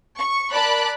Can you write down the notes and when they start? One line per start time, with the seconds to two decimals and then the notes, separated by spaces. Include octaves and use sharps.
0.18 C#6
0.52 A#4 D5 A5 B5 F#6